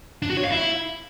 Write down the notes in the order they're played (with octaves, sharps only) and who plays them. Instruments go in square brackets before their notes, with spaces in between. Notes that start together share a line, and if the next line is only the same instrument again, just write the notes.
[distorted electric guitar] D4
F#4
C#5
F5
E4